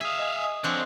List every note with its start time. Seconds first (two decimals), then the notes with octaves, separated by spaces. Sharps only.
0.01 G#4 E5 F5 D#6
0.19 D#5 G#5
0.64 D3 F3 C4 D4 C#5